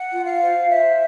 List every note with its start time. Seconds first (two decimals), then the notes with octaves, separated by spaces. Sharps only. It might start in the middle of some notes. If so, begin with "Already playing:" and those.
Already playing: F#5
0.11 F4
0.25 F5
0.41 C5
0.71 C5 E5